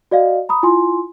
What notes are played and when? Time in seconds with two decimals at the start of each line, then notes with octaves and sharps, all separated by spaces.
0.11 F#4 D5 D#5 F5
0.49 A#5 B5 D#6
0.63 E4 F4 G#5 C6